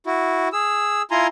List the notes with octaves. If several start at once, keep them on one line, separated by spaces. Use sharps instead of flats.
E4 F#4
G#4 E6
E4 F4 G#5 A#5 C6